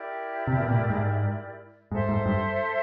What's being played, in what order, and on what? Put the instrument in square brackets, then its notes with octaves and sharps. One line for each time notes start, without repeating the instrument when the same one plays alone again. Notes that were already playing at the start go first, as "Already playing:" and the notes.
Already playing: [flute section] E4 G4 A#4 D5
[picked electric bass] C3
B2
A#2
A2
G#2
[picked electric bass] G#2 [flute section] A4 C5 E5
[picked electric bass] G#2
G2